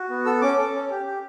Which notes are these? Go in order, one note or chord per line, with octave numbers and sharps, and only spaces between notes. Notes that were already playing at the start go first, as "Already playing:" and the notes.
Already playing: F#4
B3
A4 E6
C#4 D6
A4
C#4
G4
G4